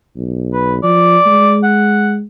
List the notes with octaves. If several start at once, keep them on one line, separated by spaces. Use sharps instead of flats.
B1
B4
F3 D5
G#3
F#5